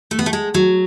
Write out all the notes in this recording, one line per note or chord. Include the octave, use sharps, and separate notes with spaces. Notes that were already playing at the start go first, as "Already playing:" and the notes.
A3
B3
A3
G#3
F#3